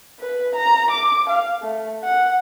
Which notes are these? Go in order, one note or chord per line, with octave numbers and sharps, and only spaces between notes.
B4
A#5
D6
F5
A3
F#5